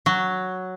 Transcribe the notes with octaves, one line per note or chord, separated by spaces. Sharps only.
F#3